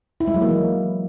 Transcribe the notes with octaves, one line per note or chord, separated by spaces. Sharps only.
E4
G#3
F#3
A#3
E3